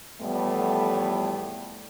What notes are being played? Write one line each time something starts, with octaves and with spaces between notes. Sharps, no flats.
E2 A2 F3 G3 A3 B3